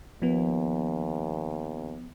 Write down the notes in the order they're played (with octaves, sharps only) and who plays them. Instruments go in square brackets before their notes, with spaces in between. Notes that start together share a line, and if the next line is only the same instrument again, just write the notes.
[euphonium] D#2 [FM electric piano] F3 B3